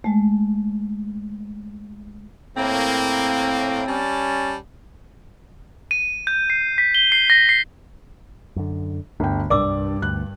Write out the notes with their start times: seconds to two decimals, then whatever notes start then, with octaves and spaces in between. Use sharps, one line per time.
0.04 G#3 A3
2.57 A2 A#3 C4
3.87 G3 C#4 A5
5.91 D#7
6.27 G6
6.50 C7
6.78 B6
6.95 G7
7.12 C7
7.30 A#6
7.49 C7
8.56 F#2 D3
9.20 G1 D2 G5
9.50 C2 G2 G#3 D4 A#4 D5 D6 E6
10.02 D2 F#6